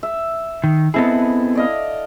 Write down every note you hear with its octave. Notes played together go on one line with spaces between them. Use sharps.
E5
D#3
B3 C4 E4 G#4 A4 D#5
D5 D#5 F5